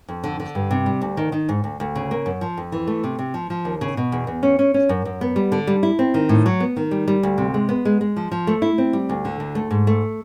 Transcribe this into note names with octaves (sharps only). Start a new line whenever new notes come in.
F2
D3
D3
G2
C3
G3
D2
D#3
D#3
G#2
D2
D2
C#3
A#3
F#2
F3
F2
E3
A3
C3
C3
F3
F3
D#2
C#3
B2
E2
E2
C#4
C#4
C#4
F#2
F#2
B3
G3
D3
G3
E4
C4
D#3
A2
F#3
B3
D#3
G3
G3
D2
C3
G#3
B3
G#3
G#3
F3
F3
A3
E4
C4
G3
D2
D3
D2
A3
G#2
A3